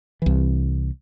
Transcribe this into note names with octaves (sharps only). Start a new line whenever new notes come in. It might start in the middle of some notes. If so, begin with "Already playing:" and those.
C2 E3